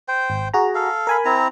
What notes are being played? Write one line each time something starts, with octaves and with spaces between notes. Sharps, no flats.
C5 G5
G#1
F#4 G#4 A#5
A4 F5
A#4 G#5 B5
C4 E4 A#5